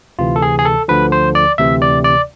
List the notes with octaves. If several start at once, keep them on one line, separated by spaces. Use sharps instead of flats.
D2 C3 E3 F4
A4
G#4
G#4
A4
D2 D3 F3 B4
C5
D5
D2 C3 E3 E5
D5
D5